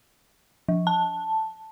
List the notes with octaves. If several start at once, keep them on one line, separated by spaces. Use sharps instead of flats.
F3
A5